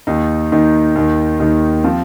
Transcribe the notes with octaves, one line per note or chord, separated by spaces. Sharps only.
D#2 D#3 D#4
D#2 D#3 D#4
D#2 D#3
D#2 D#3 D#4
F3 C4